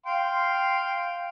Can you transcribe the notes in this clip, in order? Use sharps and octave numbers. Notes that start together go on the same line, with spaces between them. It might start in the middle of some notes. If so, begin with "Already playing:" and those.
F5 G5 C6